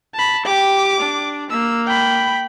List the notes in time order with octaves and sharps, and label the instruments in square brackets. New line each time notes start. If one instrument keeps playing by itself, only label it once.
[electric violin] A5 B5
[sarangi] G4 [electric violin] D6
[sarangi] D4
[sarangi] A#3 [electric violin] E6
[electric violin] G5 B5